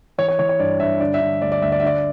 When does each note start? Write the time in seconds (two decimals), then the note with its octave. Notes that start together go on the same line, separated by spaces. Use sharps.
0.18 E3 C#5
0.29 C#5
0.39 E3 C#5
0.49 C#5
0.59 G2 D5
0.80 G2 E5
1.00 D3 D5
1.14 E5
1.21 D3
1.42 D2 D5
1.52 D5
1.62 D2 E5
1.72 D5
1.80 E5
1.83 D3 D5